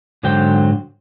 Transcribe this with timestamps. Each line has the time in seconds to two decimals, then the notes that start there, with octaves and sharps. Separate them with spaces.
0.23 G#2 D3 F#3 C5 G5